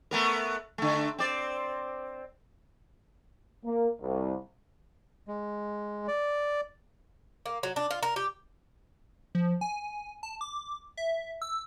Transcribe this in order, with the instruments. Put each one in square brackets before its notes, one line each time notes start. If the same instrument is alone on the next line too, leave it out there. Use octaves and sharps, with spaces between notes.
[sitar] A3 B3 A#4
D3 A3
C4 D5
[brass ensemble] A#3
C2
[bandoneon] G#3
D5
[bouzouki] A#3
F#3
D4
F4
A#4
G4
[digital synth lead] F3
G#5
A5
D6
E5
E6